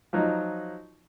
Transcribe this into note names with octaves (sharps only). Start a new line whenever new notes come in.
F3 F#3 D#4